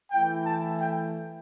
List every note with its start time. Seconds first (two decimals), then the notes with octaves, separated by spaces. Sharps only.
0.11 E3 A3 E4 G5
0.46 A5
0.81 G5